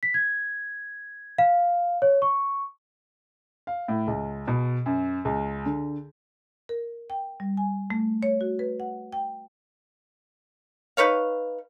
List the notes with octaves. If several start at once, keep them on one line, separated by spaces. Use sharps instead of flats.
B6
G#6
F5
C#5
C#6
F5
A2
C#2
B2
F#2
C#2
D3
A#4
G5
G3
G#5
A3
C#5
F#4
B4
F#5
G5
D#4 B4 C#5 F5